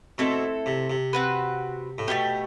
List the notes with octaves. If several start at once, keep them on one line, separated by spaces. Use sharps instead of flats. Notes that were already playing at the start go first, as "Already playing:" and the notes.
B2 A3 C4 E4 A4
C3
C3
C4 F#4 B4
A2
B2 A3 E4 G4